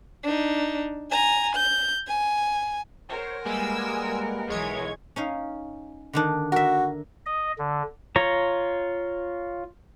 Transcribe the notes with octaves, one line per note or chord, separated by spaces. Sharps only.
D4 D#4
G#5 A#5
G6
G#5
A#4 C5 C#5 F#5
G3 G#3 A#3 B4 G#5 E6
B1 E3 G#3 C#5 G#6
C#4 D#4 F5
D3 D#3 D4
F#4 A#4 E5
D#5
D3
F4 C#5 A#5